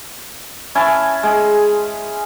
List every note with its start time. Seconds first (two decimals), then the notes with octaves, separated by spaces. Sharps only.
0.75 C#4 E4 G#5 A5
1.23 G#3 G#4